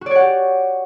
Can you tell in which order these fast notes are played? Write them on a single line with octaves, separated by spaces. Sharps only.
F#4 D5 C#5 F#5 G4